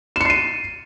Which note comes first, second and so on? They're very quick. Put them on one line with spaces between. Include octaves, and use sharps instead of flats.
E7 C#7 C7 D#7